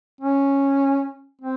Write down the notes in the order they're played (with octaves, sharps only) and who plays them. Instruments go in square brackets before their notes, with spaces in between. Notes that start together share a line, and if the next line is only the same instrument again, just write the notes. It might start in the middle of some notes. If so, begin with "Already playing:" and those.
[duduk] C#4
C4